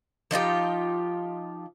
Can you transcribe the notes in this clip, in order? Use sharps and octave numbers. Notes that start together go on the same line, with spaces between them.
F3 D#4 F4 G4